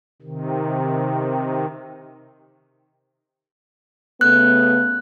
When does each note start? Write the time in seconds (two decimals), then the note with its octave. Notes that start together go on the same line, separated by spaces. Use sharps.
0.22 C3 D#3
4.21 C#3 A3 B3 F#6